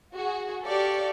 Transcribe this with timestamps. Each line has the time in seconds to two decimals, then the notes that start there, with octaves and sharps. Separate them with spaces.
0.14 F#4 G#4
0.65 G4 A4 D5 F5 C#6